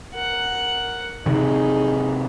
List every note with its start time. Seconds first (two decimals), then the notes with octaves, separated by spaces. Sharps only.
0.13 A#4 F#5
1.26 C3 D#3 D#4 G#4